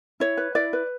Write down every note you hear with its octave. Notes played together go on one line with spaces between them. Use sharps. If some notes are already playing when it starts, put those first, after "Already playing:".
E4 C#5
B4
E4 D5
B4